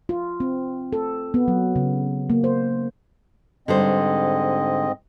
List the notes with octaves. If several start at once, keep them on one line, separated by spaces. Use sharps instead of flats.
F4
C4
A4
B3
F#3
C#3
A#3
C5
G#2 D3 G3 C4 C5 D#5